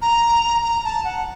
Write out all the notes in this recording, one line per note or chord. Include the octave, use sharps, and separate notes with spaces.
A#5
A#5
A5
F#5